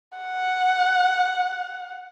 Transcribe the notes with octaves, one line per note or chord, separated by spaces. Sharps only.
F#5